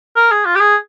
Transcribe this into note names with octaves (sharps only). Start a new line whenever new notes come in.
A#4
G#4
F4
G4
G#4